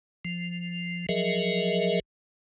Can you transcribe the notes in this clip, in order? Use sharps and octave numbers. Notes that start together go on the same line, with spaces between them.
F3
F3 F#3 G#4 A#4 D#5 E5